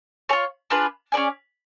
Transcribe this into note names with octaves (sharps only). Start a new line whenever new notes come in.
F4 G#4 C#5
D4 F4 G#4 B4
C#4 G#4 D5 G#5